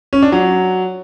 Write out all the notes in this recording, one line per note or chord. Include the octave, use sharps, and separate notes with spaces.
C#4
D4
F#3